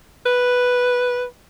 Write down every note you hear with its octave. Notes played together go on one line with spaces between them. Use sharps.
B4